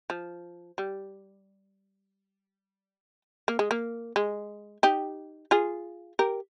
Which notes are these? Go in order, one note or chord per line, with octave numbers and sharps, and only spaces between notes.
F3
G3
A#3
G#3
A#3
G#3
D#4 G4
F4 G#4
G4 A#4